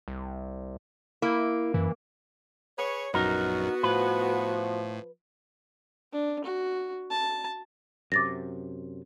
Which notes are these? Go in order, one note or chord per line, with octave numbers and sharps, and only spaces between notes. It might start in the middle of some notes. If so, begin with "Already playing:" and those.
C2
A#3 E4
F#2 E3
G#4 B4 C#5
A#1 F#2 B3 D#4 F#4 A#4
A2 F3 B4
D4
F#4
A5
F#2 C3 D6 A6 A#6